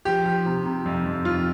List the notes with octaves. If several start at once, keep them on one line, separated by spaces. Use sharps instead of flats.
F3 G4
F3
C3
C3
F2
F2
F2 F4